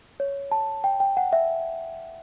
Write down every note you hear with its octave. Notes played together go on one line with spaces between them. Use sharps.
C#5
A5
G5
G5
F#5
E5